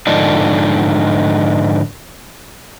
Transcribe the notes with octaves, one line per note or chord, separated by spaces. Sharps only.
G#2 D3 F3 D4 D#4